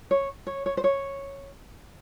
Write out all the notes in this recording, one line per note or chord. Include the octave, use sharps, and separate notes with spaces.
C#5
C#5
C#5
C5
C#5